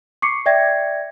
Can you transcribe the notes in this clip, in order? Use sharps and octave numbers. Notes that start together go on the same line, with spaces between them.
C#6 D6 C7 C#7
D5 E5 G5 G#6 A#6